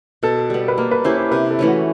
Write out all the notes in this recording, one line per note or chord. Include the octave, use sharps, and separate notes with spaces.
B2 A4
G3 B3
B4
A#3 A#4
B4
C#4 E4 G4 C5
C5
C3 B4
A4
E3 A3 C#4
F#4